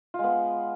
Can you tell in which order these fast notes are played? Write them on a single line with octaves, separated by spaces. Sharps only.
F4 G#3 B3